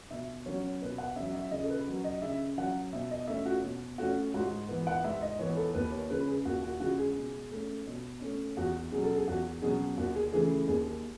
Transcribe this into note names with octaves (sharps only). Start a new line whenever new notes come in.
B2 E5
F#3 C#4 C#5
B2 B4
F#5
F#3 C#4 E5
E5
C#3 D#5
A4
B4
F#3 C#4
D#5
C#3 E5
F#3 C#4 F#5
B2 E5
D#5
A3 C#4 E5
F#4
B2
A3 C#4 F#4
G#2 F#4
E3 B3
F#5
G#2 E5
D#5
E3 B3 C#5
A4
D#2 B4
C#5
C#3 G#3 B4
G#4
D#2 F#4
F#4
C#3 G#3 F#4
G#4
B2
A3 C#4
B2
A3 C#4
E2 F#4
B2 F#3 C#4 G#4
A4
G#4
E2 F#4
B2 F#3 C#4 G#4
D#2 F#4
G#4
C#3 E3 A3 G#4
D#2 G#4